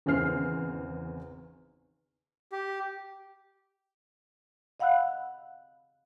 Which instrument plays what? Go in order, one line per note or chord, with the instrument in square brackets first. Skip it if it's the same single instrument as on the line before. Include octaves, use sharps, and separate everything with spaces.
[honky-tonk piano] G#1 E2 C#3 C5 F6 C7
[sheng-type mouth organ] G4
[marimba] D#5 F5 F#5 B5 E6 F#6